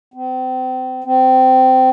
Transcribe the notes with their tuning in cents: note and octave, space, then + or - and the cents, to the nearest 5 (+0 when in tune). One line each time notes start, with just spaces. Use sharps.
C4 -35
C4 -20